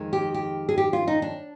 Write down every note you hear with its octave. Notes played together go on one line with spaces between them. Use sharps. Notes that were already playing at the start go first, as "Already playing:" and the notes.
Already playing: F2 D#3 G#3
G4
G4
G#4
G4
F4
D#4
D4